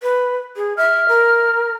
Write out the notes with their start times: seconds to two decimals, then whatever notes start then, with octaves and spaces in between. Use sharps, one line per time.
0.03 B4
0.56 G#4
0.77 E5 F6
1.09 A#4